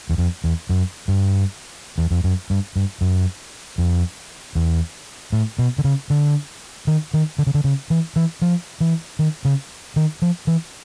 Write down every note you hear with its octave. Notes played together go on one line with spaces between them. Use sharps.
E2
F2
E2
F#2
G2
E2
F2
F#2
G2
G2
F#2
F2
E2
A2
B2
D3
C#3
D3
D#3
D#3
D3
C#3
D3
C#3
E3
E3
F3
E3
D#3
C#3
D#3
F3
E3